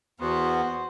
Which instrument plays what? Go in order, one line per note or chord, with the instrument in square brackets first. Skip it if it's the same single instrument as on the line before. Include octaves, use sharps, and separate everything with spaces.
[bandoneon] E2 B3 [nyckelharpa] F#4 C5